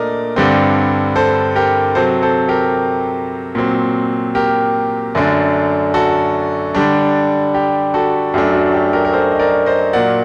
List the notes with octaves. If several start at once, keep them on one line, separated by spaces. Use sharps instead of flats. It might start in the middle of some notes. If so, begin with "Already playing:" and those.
Already playing: A#2 A3 D4 A#4 D5 D#5
G2 D3 G3 C4
A4 C5
G4 A#4
C3 F#3 C4 A4 C5
A4 C5
G4 A#4
A#2 F#3 C4
G4 A#4
F#2 D3 A3 D4
F#4 A4
D3 G3 D4
G4
F#4 A4
F#2 F#3 A3 D4 G4
F#4
G4
G4 A#4
A#4
A4 C5
D#5
A#4 D5
C5 D#5
A#2 F#3 A#3 D5 F#5